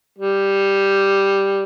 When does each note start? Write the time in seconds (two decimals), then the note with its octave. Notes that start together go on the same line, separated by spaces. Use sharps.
0.19 G3